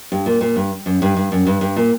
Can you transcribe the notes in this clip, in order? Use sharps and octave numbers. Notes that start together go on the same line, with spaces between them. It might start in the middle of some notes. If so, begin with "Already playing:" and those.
G2
A#2
A#2
G2
F#2
G2
G2
F#2
G2
G2
A#2